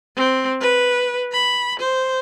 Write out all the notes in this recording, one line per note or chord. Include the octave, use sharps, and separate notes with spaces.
C4
B4
B5
C5